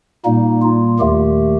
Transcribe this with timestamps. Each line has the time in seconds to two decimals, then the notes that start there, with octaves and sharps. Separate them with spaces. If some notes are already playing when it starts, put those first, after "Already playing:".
0.24 A#2 G3 A#3 D#4
0.62 F4
0.99 D#2 D#3 A3 G4